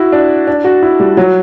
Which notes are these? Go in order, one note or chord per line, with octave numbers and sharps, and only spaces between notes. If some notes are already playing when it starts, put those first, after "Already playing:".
Already playing: E4 F#4
D4
D4
F#4
E4
G3
F#3